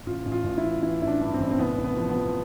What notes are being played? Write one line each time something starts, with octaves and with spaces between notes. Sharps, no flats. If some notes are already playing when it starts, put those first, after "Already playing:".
A1 F4
A1
F4
A1
E4
E3
E3 E4
A1 E4
D4
G2
C4
A1
C4
C2 B3
C2
B3
F3
B3
F3